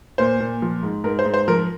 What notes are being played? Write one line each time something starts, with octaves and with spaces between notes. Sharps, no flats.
A#2 C5
A#2
F3
G#2
G#2 A#4
C5
G#2
C5
F3 A#4